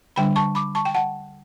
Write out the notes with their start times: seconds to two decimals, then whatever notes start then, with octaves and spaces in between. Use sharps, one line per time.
0.16 D3 G3 D4 G5 B5
0.36 A5 C#6
0.55 B5 D6
0.75 A5 C#6
0.85 G5
0.95 F#5 A5